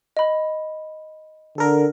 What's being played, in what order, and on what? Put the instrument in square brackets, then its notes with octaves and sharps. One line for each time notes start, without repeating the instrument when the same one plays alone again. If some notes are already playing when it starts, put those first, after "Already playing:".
[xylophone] D#5 B5
[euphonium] D3 [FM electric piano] A4 A#4